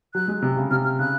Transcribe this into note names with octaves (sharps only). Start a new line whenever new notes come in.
F#3 F#6
G#3
C3
C#3
C3 F6
F6
C#3 F#6